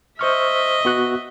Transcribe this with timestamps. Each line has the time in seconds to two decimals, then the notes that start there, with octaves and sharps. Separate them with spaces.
0.19 C5 D#5 E5 C#6 F6
0.85 B3 F#4 F#6